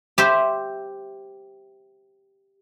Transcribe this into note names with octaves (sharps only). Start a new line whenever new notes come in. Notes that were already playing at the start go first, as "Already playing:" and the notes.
G4 C5 E5